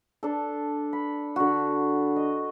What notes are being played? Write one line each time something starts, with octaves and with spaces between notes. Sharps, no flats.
D4 A4
B5
D3 F#4
D#5